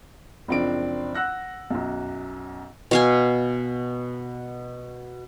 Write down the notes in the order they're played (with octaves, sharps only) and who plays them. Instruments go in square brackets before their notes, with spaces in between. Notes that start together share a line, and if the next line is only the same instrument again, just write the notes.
[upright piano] F#1 F3 C4 D4 D7
F#5 E6 F#6 A#6
B1 F#2
[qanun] B2 F5 G#5